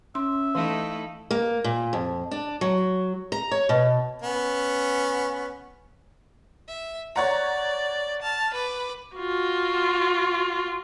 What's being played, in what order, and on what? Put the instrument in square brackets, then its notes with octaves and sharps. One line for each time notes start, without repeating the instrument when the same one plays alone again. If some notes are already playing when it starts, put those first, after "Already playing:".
[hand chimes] C#4 [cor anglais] E5 [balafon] C6
[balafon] E3 [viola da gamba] A3 D#4 E4 [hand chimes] F5
[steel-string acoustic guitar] A#3
A#2
F2
D4
F#3
A#5
C#5
B2
[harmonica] B3 C#4
[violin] E5
[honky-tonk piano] C#5 F#5 A#5 [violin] D5
[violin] A5 F6
B4 D6
[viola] F4 F#4